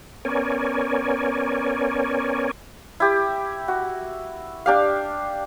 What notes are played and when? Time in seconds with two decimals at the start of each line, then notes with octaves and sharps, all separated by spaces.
0.25 B3 C#4 A#4 C#5 D5 G#5
3.00 E4 G4
3.68 F#4
4.66 D4 G4 F5